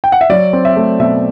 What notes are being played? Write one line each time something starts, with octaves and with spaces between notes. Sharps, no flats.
G5
F#5
E5
F#3 D5
C4
E5
A3
B2 E5